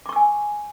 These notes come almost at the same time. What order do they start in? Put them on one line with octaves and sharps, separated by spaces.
D6 C#6 E6 G#5